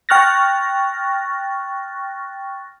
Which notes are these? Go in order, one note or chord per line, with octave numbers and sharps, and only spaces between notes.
G5 C#6 F6 F#6 A6 A#6